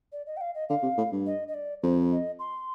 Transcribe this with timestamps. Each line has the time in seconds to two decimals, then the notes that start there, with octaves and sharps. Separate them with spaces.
0.12 D5
0.27 D#5
0.37 G5
0.41 F5
0.55 D#5
0.69 D3 F5
0.83 C3
0.98 A2
1.12 G2
1.26 D#5
1.48 D#5
1.54 D5
1.82 F2 C5
2.11 D#5
2.39 C6